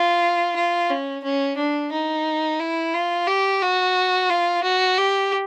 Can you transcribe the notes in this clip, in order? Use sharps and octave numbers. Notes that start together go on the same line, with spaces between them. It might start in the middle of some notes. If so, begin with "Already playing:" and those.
Already playing: F4
F4
C#4
C#4
D4
D#4
E4
F4
G4
F#4
F4
F#4
G4